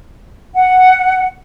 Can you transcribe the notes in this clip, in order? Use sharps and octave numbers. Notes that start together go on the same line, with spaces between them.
F#5